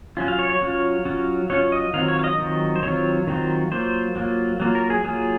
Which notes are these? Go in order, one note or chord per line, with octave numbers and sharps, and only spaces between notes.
F#3 C#4 F4
F5
C#5
C#5
F#3 C#4 F4
F#3 C#4 F4
F#3 C#4 F4 C#5
D#5
D#3 F#3 C4 F4 F5
C#5
F5
D#5
D#3 F#3 C4 F4
C5
D#3 F#3 C4 F4 C#5
D#3 F#3 C4 F4
F#3 A#3 F4 C5
F#3 A#3 F4
F#3 A#3 F4
A#4
G#4
F#3 A#3 F4 G#4